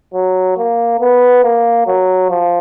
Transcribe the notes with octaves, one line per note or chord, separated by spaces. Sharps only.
F#3
A#3
B3
A#3
F#3
F3